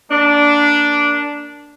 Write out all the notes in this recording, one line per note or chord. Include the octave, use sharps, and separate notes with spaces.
A#3 D4